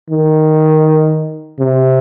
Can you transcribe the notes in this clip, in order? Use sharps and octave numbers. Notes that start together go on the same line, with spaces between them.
D#3
C3